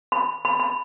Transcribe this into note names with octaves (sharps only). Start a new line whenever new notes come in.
B5
B5
B5